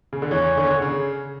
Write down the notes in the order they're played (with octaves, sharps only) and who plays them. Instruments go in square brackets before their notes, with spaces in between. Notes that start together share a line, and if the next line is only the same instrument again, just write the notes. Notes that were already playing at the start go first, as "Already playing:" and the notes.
[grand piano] C#3
D3
[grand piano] E2 E3 [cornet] C#5
[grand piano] D3
D3
C#3